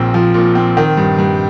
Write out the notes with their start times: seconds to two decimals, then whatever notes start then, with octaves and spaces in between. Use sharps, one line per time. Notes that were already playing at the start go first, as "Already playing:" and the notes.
Already playing: A#1 A#2 C4
0.14 F3
0.34 A#2
0.55 C4
0.77 D#3
0.97 G2
1.19 G2